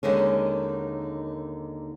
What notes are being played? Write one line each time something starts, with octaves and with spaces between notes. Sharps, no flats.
D#2 D3 D#3 G#3 C#4